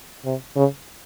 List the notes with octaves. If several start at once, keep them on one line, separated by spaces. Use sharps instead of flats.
C3
C#3